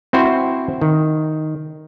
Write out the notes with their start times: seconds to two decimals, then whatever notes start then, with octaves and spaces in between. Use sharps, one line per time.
0.13 C4 E4 F#4 C5
0.82 D#3